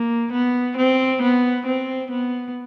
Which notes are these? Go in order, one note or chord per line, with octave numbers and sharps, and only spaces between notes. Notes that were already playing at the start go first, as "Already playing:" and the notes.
Already playing: A#3
B3
C4
B3
C4
B3